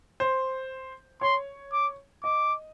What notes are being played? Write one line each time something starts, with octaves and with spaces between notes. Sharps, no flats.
C5
C#5 C6
D6
D#5 D6